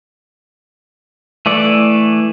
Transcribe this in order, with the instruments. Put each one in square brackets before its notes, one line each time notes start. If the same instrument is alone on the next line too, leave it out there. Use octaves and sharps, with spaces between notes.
[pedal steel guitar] E3 A3 D5